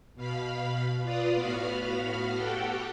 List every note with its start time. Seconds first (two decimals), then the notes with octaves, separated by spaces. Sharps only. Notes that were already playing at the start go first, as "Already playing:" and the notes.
0.15 B2 F5 B5
1.02 F4 B4 D5 F5 D#6
1.34 A2 B3 F#4 F5 B5 F6
2.36 F#4 G4 A4 F#5 G5